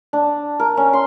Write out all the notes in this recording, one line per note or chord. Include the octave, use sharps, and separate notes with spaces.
D4
A#4
C#4
C6